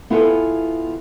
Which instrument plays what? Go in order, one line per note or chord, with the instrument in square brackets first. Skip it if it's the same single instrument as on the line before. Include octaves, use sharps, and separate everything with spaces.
[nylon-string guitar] B3 E4 F4 G#4 A4 B4